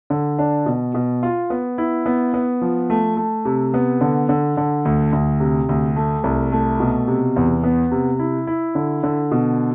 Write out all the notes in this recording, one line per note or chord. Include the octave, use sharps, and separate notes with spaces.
D3
D4
B2
B2
F4
B3
E4
B3
B3
F3
A3
A3
C3
B3
D3
D3
D3
D2
D2
C3
D2
A3
C2
A3
B2
C3
E2
B3
C3
E4
E4
D3
D3
B2